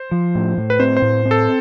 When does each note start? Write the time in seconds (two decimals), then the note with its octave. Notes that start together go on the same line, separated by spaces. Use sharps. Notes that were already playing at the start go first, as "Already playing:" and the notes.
Already playing: C5
0.11 F3
0.35 A2
0.58 A2
0.70 B4
0.79 C4 C5
0.97 C5
1.02 A2
1.25 C4
1.31 A4